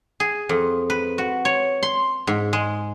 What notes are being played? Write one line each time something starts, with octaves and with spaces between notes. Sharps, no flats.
G#4
F2
B4
F#4
C#5
C6
G#2
G#3